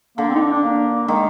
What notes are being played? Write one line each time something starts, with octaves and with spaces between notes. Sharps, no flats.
D3 A#3
C4
D#4
D4
D4
A#3
D#3 G#3